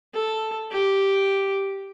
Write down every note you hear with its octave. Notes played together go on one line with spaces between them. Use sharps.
A4
G4